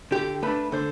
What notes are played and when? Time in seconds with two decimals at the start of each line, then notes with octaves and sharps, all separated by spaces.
0.11 D3 G4
0.42 A3 D4 B4
0.72 D3 C5